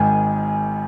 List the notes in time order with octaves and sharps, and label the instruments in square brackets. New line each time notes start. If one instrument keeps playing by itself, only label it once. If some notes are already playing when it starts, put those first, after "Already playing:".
Already playing: [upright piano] G#1 G#2 D#3 [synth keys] G#5